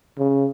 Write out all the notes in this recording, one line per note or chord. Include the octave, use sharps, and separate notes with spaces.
C#3